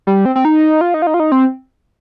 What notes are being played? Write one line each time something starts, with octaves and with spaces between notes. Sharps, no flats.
G3
C4
C4
D#4
F4
D#4
F4
D#4
F4
D#4
C4